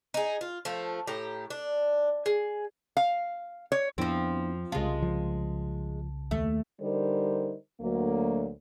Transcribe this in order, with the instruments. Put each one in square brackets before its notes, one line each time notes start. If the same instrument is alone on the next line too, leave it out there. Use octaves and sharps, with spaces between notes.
[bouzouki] D#4 G#4
F4
F3 A3
A2 G4 A#5
D4
G#4
[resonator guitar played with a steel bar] F5
C#5
[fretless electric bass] F2 [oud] F3 C4 [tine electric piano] B3 D4 E4
[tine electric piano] C2 C#3 A5 [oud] G#3 F4
[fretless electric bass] F3
[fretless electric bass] D#2 [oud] A3
[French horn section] D3 G3 D#4 A#4 C5
D2 F#3 A#3